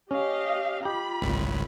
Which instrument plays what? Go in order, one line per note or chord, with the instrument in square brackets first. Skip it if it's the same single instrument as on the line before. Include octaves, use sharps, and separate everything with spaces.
[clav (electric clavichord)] C#4 [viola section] G4 D#5 F5
[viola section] F4 B5 [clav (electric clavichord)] G4
[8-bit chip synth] G#1 C#2